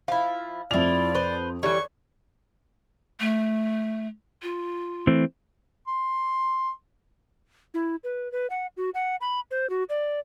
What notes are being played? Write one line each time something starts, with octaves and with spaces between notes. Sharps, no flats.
F3 E4 F5
F2 E4 F4 D5 F7
B4 C5
E3 G3 A4 C#5 C#6
A3
F4
E3 A3 C4
C6
E4
B4
B4
F#5
F#4
F#5
B5
C5
F#4
D5